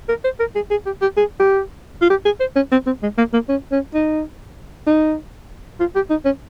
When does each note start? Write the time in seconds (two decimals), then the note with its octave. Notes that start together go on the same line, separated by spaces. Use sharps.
0.09 A#4
0.24 C5
0.40 A#4
0.55 G#4
0.71 G#4
0.86 G4
1.02 G4
1.17 G#4
1.40 G4
2.02 F4
2.10 G4
2.25 G#4
2.40 C5
2.56 C#4
2.72 C4
2.86 C4
3.03 G#3
3.18 A#3
3.33 A#3
3.49 C#4
3.72 C#4
3.94 D#4
4.87 D#4
5.80 F4
5.95 G4
6.10 D#4
6.25 C#4